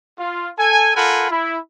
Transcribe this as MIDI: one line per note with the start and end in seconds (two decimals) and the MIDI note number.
0.19 0.49 65
0.58 0.92 69
0.58 0.92 80
0.96 1.28 65
0.96 1.28 69
0.96 1.28 70
0.96 1.28 78
0.96 1.28 80
0.96 1.28 83
1.31 1.58 64